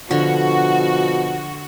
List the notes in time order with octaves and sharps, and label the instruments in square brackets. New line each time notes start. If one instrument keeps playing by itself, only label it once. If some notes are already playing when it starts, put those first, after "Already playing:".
[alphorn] B2 [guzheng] D3 [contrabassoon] F3 [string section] F#4